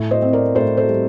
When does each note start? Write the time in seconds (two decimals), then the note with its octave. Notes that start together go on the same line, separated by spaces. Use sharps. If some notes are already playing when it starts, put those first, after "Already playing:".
Already playing: A2
0.11 C5 D#5
0.22 C4
0.33 A#4 D5
0.55 A2 A4 C5
0.77 A4 C5
0.89 G3